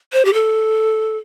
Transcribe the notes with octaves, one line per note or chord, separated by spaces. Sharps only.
C5
G4
A4